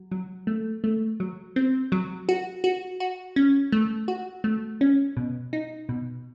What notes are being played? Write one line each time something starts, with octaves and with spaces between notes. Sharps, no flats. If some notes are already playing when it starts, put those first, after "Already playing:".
Already playing: F#3
F#3
A3
A3
F#3
C4
F#3
F#4
F#4
F#4
C#4
A3
F#4
A3
C#4
B2
D#4
B2